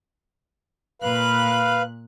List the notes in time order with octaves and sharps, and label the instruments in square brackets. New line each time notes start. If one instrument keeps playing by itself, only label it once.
[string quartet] A#2 F#6 [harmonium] B4 F5